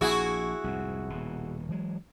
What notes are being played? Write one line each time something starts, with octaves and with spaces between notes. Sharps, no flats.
A#1 E4 F#4 G#4
C2 F2 G#2
D#1 B2
E3 F#3 G#3